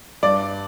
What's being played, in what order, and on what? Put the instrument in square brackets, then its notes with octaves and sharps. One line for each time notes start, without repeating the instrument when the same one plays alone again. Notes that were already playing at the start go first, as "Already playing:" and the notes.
[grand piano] G2 [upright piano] D5